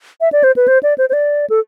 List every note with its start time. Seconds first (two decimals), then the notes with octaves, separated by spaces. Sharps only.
0.21 E5
0.32 D5
0.44 C5
0.56 B4
0.68 C5
0.83 D5
0.98 C5
1.09 C5
1.13 D5
1.50 A4